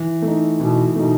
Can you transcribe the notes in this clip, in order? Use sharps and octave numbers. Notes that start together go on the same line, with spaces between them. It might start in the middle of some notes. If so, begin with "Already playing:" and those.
Already playing: E3
A3 D#4
B2 E3
B2 A3 D#4